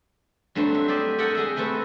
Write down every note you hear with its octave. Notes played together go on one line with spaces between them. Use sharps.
G2 F#3 A3 C4 D4
E5
G4 C5 D5 D#5
A4 A#4 D#5 E5 F#5 G5
G#3 G#4 A4 E5
A3 C4 B4 D#5 E5